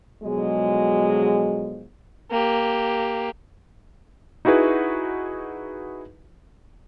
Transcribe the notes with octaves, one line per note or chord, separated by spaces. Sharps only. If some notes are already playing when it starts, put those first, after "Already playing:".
B2 D3 F3 F#3 G#3
A#3 G4
D#4 E4 F#4 G#4 B4